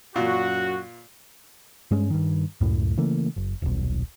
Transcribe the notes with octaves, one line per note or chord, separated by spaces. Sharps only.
F#2 A#2 F#4
G2 G#3 C#4
G2 D#3
C#2 F#2 A2
C#3 E3 A3 A#3
F#1
D#1 B1